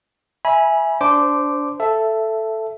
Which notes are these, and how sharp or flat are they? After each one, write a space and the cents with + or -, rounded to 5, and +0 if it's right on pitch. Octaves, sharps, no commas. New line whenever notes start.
E5 +0 G#5 +0 B5 -35
D4 -20 C5 -15 D6 +0
A4 +0 E5 +15